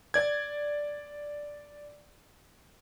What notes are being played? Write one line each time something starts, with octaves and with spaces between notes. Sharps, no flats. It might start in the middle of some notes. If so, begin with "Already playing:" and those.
D5 G#6